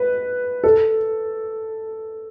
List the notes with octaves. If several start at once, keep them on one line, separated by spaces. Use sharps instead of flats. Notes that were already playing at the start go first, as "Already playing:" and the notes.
Already playing: B4
A4